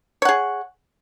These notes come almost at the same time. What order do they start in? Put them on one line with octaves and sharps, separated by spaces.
C#5 F#5 G#4